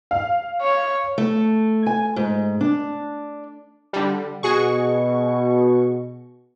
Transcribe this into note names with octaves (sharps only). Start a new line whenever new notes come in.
F5
C#5
A3
G#5
G#2
D4
D3 G3
B2 F#4 G#4 C#6